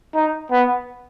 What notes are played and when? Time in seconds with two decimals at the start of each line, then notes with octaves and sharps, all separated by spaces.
0.15 D#4
0.52 B3